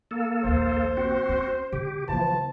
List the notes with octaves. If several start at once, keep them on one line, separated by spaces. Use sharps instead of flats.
A#3 A4
A#1 D#2 C5
C4 F#4
C#4
D3 G4
C#3 E3 F3 B3 A5